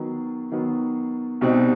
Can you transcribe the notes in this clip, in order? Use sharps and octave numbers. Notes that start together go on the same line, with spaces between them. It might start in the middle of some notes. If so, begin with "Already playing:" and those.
Already playing: D#3 F#3 B3
D#3 F#3 B3
C2 B2 G3 C4 D#4